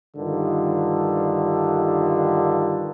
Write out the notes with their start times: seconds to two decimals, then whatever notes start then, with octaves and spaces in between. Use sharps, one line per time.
0.17 G2 D3 D#3 F4